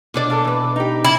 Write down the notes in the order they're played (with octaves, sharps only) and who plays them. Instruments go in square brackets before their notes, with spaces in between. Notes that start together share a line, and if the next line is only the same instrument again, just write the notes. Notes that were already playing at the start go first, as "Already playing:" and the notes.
[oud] B2 D4 D5
[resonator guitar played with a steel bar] A#3 G#4 A4
E3 B4
D#4 G4
[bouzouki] E4